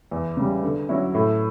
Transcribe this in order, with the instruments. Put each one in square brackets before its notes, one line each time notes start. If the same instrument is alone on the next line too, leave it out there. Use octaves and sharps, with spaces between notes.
[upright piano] E2
C#3 G3
D3
F#3 C#4 E4
A2